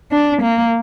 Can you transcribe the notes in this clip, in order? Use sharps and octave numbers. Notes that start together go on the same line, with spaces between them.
D4
A#3